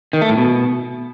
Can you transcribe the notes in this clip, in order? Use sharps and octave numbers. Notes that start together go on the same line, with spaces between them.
D#3
A3
A2
B2